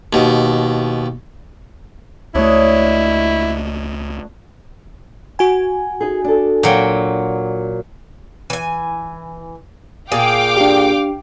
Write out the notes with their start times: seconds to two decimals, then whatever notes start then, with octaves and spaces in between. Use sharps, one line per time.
0.13 D#2 B2
2.35 C#2 A3 D4 E4 C#5 D#5
5.39 F#4 G#5
6.01 D#4 G#4
6.25 D4 A4
6.63 A#2 F#3 G5
8.50 E3 G#5
10.12 A#2 G#4 F5 G5 D6
10.57 D4 G4